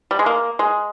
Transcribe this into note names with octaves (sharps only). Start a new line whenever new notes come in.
G3
G#3
A#3
G#3